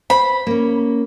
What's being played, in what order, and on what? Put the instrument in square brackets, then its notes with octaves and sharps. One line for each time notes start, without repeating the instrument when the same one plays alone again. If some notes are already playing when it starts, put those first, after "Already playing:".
[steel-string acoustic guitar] C5 [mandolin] B5
[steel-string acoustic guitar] A#3 C#4